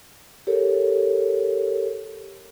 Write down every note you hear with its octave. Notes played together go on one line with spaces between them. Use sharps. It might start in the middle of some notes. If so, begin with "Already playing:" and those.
G4 A4 A#4 C#5